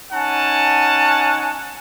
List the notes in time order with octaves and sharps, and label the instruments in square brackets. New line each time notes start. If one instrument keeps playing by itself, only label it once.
[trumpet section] C#4 D#4 F#5 G#5 A5